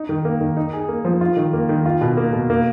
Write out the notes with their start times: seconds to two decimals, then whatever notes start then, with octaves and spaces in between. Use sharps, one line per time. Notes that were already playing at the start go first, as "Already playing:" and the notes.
Already playing: D#4
0.09 D#3
0.25 A#3
0.41 D#3
0.57 D#4
0.73 G#4
0.89 A#3
1.05 F3
1.21 F4
1.37 D#3
1.53 A#3
1.69 D#3
1.85 F4
2.01 B2
2.17 A#3
2.33 B2
2.50 A#3